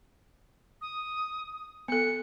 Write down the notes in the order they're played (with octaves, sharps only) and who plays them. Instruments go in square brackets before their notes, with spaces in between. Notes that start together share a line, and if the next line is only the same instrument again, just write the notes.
[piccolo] D#6
[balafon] B3 A4 [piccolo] C#7